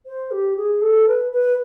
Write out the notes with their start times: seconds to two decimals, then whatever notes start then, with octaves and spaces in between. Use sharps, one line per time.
0.06 C5
0.31 G4
0.57 G#4
0.81 A4
1.07 B4
1.32 B4